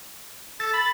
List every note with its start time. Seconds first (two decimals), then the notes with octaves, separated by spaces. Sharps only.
0.60 A4 A6
0.73 B5